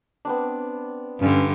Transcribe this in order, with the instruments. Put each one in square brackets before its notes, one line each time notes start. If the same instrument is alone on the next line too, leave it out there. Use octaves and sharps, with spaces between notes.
[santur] B3 C4 D4
[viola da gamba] G2 D3 [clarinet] C#4